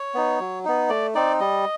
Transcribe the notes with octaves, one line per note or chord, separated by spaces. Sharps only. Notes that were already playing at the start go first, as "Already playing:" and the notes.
Already playing: C#5
B3 D#4
F#3
B3 D#4
A3 D5
C4 D#4 D5
G3 D#5